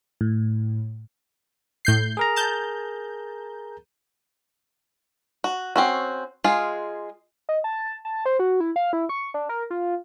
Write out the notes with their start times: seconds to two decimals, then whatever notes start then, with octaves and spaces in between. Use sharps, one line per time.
0.21 A2
1.85 A2 G6 C7
2.17 G#4 A#4 A#5
2.36 A5 G6
5.44 F#4
5.76 C4 C#4 F#4
6.44 G#3 F4 G#4
7.49 D#5
7.64 A5
8.05 A5
8.26 C5
8.39 F#4
8.60 E4
8.76 F5
8.93 E4
9.09 C#6
9.34 D4
9.49 A#4
9.71 F4